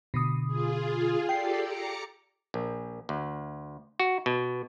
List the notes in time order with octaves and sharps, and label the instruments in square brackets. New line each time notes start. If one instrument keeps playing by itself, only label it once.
[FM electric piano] B2 D3 D#6
[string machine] F4 G#4
[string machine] G4 A4 D5 [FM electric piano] G5 C7
[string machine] A#5 D6 C#7
[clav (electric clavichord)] A#1
D2
F#4
B2